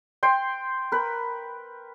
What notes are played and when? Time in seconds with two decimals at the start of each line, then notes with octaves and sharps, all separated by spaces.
0.23 G5 C6
0.92 A#4 B4